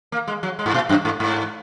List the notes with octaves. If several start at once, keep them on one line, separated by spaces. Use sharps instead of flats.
A#3
G#3
F#3
G#3
G#2
A#2
F#2
G#2
G#2